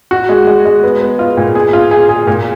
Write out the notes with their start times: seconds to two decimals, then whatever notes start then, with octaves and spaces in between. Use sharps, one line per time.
0.11 F#4
0.29 G#3
0.47 G#3
0.65 G#3
0.83 B3
1.01 B3
1.19 F4
1.37 A#2
1.55 G#4
1.73 F4
1.91 G#4
2.09 G#4
2.27 A#2